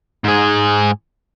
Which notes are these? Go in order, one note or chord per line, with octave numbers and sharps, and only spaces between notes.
G#2 G#4